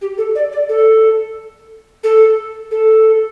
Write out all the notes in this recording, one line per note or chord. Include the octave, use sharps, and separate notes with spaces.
G4
A4
D5
D5
A4
A4
A4